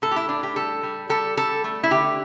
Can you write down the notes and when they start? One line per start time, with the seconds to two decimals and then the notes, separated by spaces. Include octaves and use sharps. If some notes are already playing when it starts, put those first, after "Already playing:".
0.02 A2 A4
0.11 G4
0.16 E4
0.29 A2 D4
0.43 G4
0.56 G3 A4
0.83 G3
1.09 G3 A4
1.37 G3 A4
1.64 A3
1.83 E4
1.90 D3 G4